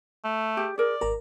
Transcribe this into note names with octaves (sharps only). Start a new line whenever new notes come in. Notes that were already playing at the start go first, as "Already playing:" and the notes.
A3
G4 G#4
G#4 A#4 D5
G#1 A#4 A#5